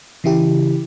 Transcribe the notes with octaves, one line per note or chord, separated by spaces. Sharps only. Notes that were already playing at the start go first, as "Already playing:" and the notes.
C#3 E3 E4 G4